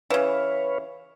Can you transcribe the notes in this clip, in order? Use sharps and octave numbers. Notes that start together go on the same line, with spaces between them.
C#3 E3 B4 C#5 F5